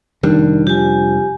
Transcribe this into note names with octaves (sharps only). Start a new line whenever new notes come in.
F1 D#3 G3 D4
F3 G4 G#5